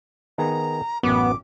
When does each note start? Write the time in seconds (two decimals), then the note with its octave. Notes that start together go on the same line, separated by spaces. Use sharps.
0.38 D#3 B3 G#4 A#5
1.03 A1 F#2 B3 D6